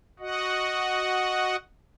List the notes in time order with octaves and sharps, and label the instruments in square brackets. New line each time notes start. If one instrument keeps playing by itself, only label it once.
[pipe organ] F#4 D#5 F#5